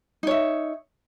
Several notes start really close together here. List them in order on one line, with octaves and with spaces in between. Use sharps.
D#4 C#5 E5